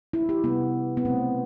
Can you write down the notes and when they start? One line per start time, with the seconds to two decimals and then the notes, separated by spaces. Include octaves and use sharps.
0.13 E4
0.29 G4
0.44 C3 G3 B3
0.97 B3
1.05 B2 F#3 A3 C4